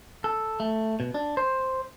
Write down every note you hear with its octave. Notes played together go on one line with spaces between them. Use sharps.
A4
A3
B2
D4
C5